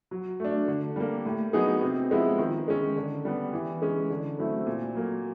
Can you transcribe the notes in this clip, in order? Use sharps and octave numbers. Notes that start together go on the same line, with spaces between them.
F#3
A3 D4
D3
G3 A#3
A2
F#3 B3 D#4 G#4
C3
F3 G#3 B3 E4
D#3
G#3 C#4
D3
G3 B3
E3
G#3 C#4
D3
F#3 A3 C4 E4
A#2
F#3 A#3